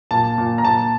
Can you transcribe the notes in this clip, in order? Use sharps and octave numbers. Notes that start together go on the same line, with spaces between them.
A#2 A5
A#2
A#5
A#2 A5